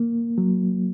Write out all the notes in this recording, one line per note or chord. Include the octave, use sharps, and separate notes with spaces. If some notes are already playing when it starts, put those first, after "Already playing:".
Already playing: A#3
F#3